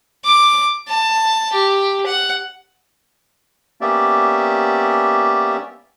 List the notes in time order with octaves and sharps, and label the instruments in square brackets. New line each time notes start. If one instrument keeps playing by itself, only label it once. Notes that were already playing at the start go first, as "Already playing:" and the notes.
[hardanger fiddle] D6
A5
G4
F#5
[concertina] A#3 B3 C#4 G4 D5 E5